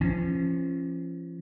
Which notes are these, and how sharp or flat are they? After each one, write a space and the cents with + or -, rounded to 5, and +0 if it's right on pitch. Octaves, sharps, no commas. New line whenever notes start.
F3 -35 C#4 -25